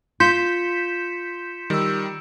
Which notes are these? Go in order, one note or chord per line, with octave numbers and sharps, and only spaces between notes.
F4 C6 G6 B6 C#7 E7
D#3 G3 E6 D7